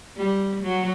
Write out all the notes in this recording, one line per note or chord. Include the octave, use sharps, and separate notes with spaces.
G3
F#3